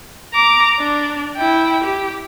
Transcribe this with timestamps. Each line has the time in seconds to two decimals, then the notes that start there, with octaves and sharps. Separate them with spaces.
0.34 A#5 D6
0.79 D4
1.37 E4 G5
1.84 G4